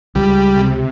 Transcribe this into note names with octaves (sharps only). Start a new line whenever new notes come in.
C#2 G3
C3